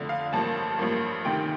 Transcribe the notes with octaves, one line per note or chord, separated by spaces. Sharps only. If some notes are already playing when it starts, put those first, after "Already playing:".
Already playing: F2 D3 A3 D4
F5
A1 G2 F3 A#3 A5
A1 G2 F3 A#3
D2 C3 D#3 G5